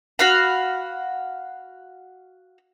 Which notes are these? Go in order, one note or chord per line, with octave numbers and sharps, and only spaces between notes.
F#4 F5 B5